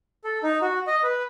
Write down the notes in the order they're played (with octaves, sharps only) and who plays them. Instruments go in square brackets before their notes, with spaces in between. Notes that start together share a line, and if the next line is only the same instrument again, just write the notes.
[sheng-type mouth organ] A4
D#4
F#4
D#5
B4